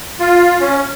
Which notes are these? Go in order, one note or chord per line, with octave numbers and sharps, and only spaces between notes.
F4
C#4